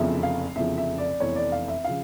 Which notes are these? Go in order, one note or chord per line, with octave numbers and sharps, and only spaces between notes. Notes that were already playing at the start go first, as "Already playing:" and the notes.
Already playing: F1 E2 C#3 F3 E5
F5
F1 E2 C#3 F3 E5
E5
D5
F1 E2 E3 C#5
D5
F5
E5
C#3 F3 F5